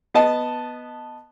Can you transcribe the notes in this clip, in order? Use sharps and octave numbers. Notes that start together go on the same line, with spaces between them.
B3 D#5 A5